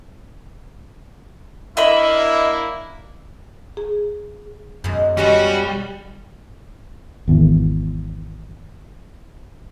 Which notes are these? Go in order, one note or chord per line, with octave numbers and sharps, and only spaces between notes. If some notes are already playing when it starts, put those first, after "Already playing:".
A#3 D4 E4 D#5 E5 B5
G#4
F#2 B2 G#3
B2 G3 G#3 C#4 F#4 C6
G#1 E2